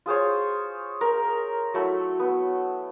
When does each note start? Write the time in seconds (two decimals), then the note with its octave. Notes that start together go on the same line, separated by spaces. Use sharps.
0.06 F4 G#4 C5 C#5
1.01 A#4
1.74 F#3 A3 E4
2.19 B3